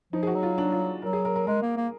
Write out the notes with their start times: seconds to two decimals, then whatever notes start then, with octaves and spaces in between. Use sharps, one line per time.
0.13 F3 D#4
0.23 G#4
0.27 F#4
0.35 F#3
0.43 F4
0.58 D4
0.72 F4
1.02 F#3 A#4
1.13 G#4
1.25 A#4
1.36 A#4
1.47 G#3 A#4
1.62 A#3
1.77 A#3